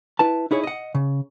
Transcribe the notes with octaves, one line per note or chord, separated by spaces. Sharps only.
E4 B4 A5
D#4 E4 G#4 C#5
D#5 F#5
C#3